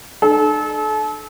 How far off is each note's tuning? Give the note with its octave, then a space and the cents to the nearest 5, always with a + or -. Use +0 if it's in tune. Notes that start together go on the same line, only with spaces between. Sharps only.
D4 +45 A4 -35